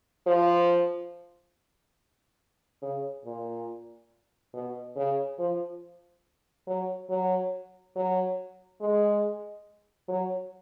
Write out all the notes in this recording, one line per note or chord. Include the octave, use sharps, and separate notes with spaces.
F3
C#3
A#2
B2
C#3
F3
F#3
F#3
F#3
G#3
F#3